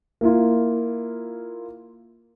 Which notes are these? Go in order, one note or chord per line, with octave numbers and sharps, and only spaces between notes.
A#3 E4 F4